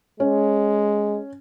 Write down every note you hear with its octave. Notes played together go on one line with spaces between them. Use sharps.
G#3 C#4